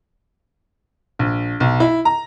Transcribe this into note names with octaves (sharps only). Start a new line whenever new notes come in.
A#1
B1
E4
A#5